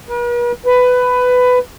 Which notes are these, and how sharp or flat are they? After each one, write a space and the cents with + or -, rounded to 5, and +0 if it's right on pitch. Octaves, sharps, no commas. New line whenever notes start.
B4 -45
B4 +15